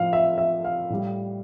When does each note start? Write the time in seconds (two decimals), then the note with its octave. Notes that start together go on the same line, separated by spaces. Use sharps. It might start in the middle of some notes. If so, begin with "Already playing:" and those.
Already playing: A2 F3 F5
0.13 E5
0.38 E5
0.65 F5
0.90 A2 G3